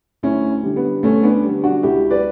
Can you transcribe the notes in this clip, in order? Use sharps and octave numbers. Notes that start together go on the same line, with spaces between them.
D2 C#4 E4
D3 G3
B3
D2 A3 C#4
B3 D4
D3 G3
D4 F#4
C#2 E4 G4
B4 D5